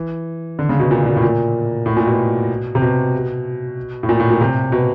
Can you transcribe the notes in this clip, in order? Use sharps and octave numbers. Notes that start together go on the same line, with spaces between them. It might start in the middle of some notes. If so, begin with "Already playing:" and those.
Already playing: E3
D3
C#3
B2
A#2
A#2
A2
A#2
A2
A#2
B2
C3
B2
A2
A#2
A2
A#2
C3
B2